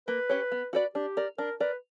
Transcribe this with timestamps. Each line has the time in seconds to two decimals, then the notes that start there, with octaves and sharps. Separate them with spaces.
0.08 A#3 B4
0.29 C#4 G4 C#5
0.52 B3
0.73 F#4 B4 D5
0.95 D4 G4
1.17 A#4 D5
1.38 D4 A#4
1.60 A#4 B4 D5